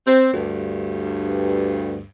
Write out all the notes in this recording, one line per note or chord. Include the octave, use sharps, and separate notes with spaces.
C4
D2 G2